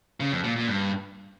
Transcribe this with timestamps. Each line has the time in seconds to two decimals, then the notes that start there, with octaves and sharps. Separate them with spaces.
0.20 C#3
0.32 F2
0.44 A#2
0.56 A#2
0.68 G2